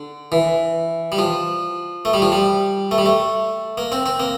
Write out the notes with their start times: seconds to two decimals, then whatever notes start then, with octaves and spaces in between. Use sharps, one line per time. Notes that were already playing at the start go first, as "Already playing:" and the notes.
Already playing: D3
0.32 E3
1.12 G3
1.18 F3
2.05 A3
2.14 G3
2.22 F3
2.32 G3
2.91 A3
2.98 G3
3.06 A3
3.78 A#3
3.92 C4
4.06 C4
4.20 A#3